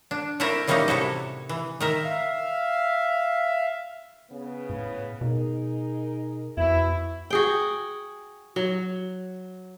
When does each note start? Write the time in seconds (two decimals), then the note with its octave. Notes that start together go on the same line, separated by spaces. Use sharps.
0.11 D4
0.40 A3 C4 E4 A#4 D5 A5
0.67 A2 E3 G3 A#3 C#4 D#4
0.88 C3 E4 F#4 A4
1.49 E3
1.80 D#3 A#4 E5
2.04 E5 F5
4.30 C#3 B3
4.70 A2
5.21 B2 D#4 G#4 A#4
6.57 F2 B2 E4
7.30 F#4 G#4 G5
8.56 F#3